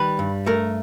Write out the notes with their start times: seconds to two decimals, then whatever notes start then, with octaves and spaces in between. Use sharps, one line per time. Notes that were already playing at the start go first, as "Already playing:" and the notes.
Already playing: D#3 G3 B4
0.19 G2
0.46 A3 A#4